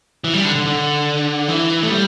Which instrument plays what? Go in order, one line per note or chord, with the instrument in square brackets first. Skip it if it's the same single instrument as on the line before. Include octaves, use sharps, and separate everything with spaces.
[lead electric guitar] E3
G3
D3
D3
D3
E3
A3
G3